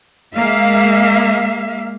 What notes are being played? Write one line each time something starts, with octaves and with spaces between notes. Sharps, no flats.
G#3 A#3 E5 F5